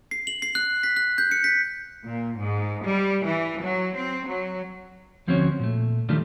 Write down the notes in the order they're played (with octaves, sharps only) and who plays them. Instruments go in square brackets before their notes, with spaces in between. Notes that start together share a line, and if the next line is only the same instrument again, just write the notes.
[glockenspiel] C7
F#7
C7
F#6
B6
F#6
G6
C#7
B6
[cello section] A#2
G#2
G3
E3
F#3
C4
F#3
[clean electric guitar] D2 F3 C4 C#4 F#4 C#5
A#2 A3
D#3 F3 G3 A3 D4 F4